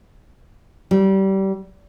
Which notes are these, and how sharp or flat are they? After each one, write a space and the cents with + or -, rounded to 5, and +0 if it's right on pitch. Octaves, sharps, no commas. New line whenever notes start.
G3 -25